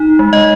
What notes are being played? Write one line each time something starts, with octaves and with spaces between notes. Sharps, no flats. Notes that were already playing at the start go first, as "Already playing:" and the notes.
Already playing: D#4
G#3
D#5